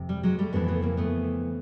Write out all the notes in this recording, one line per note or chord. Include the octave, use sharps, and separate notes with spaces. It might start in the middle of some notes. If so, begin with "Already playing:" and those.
Already playing: F2 C3
G3
F#3 G#3
G3 A3
F2 C#3 E3 A3 B3
A3 B3
A#3 C4
A3 B3